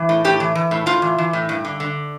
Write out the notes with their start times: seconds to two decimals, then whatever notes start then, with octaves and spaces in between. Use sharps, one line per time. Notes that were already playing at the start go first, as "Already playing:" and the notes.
Already playing: E3
0.09 A2
0.24 A2 G4
0.40 E3
0.55 E3
0.71 A2
0.86 A2 F4
1.02 E3
1.18 E3
1.33 A2
1.49 G2
1.65 D3
1.80 D3